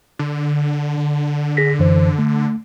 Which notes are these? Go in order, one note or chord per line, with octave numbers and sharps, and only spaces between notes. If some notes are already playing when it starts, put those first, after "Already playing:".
D3
D3
G#4 A#6 B6
F#2 E3 C5
A3